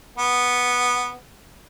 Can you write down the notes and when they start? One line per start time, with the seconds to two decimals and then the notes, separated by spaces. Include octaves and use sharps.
0.18 B3